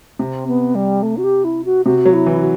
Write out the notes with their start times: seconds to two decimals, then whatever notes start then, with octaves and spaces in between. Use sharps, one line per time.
0.19 C3 C4
0.47 B3
0.75 G3
1.02 A3
1.17 F#4
1.23 G4
1.44 E4
1.65 F#4
1.85 C3 F#4
2.06 F#3
2.13 E4
2.26 E3
2.40 F#4